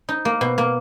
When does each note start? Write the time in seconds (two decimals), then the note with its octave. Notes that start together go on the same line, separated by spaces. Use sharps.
0.09 D#4
0.25 A#3
0.41 B2
0.58 A#3